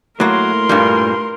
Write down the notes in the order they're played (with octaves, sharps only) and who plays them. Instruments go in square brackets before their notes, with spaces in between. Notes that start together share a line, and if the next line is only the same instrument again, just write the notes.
[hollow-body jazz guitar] A2 A#3 [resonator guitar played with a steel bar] F#3 [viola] A#4 C6
[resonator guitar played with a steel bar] G2 A#2 G3